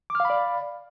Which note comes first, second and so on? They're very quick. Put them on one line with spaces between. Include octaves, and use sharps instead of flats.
D6 F6 F5 B5 D5